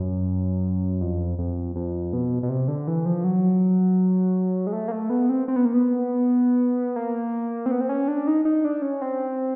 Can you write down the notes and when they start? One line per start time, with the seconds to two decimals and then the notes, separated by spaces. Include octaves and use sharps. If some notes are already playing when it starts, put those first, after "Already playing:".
Already playing: F#2
1.01 F2
1.39 F2
1.76 F2
2.13 B2
2.43 B2
2.49 C3
2.68 D3
2.87 E3
3.06 F3
3.24 F#3
4.67 G#3
4.73 A3
4.88 A#3
4.92 A3
5.10 B3
5.29 C4
5.48 C4
5.56 B3
5.65 A#3
5.74 B3
6.96 A#3
7.66 C4
7.71 B3
7.81 C4
7.89 C#4
8.08 D4
8.27 D#4
8.45 D#4
8.65 D4
8.82 C#4
9.02 C4